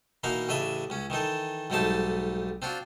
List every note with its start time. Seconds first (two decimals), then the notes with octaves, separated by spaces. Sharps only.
0.24 B2 E3 A#3 D#4 A#4 F5
0.49 A1 C#3 D4 D#5 E5 D#6
0.90 C#2 C#4
1.10 D#3 E3 D#4 A4
1.70 B1 G#2 G3 A3 D#4 A5
2.62 C4 D4 F4 F#4